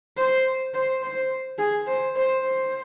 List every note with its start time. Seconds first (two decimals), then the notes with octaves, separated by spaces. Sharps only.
0.17 C5
0.74 C5
1.02 C5
1.58 G#4
1.86 C5
2.15 C5
2.43 C5